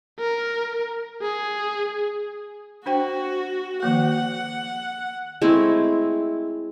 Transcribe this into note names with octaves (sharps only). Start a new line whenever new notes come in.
A#4
G#4
D4 F#4 C5 G5
D#3 F3 A#3 F#5
G#3 A3 C4 E4